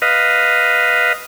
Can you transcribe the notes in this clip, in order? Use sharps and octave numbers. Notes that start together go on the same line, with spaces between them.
B4 D#5 F5